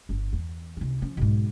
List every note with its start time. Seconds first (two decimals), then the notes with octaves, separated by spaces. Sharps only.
0.09 G1 F2
0.33 E2
0.77 C2 C#4
1.02 F3 C#4
1.17 B1 G#2